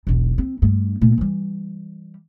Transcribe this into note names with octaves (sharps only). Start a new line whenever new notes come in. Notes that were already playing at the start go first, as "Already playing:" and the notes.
E1 B1
C4
G2 A3
A#2 A3
E3 G3